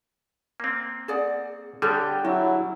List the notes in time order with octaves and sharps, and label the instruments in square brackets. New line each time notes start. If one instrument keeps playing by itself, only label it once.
[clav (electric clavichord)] A#3 C4
[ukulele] G#4 D5 F#5
[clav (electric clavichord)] D3 G3 G#5 [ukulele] G#4 A4 C#5 [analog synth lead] G5
[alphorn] F#3 [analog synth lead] E4 [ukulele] F#4